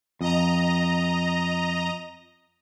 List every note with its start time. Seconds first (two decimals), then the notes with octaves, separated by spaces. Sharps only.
0.21 F2 D#5 A#5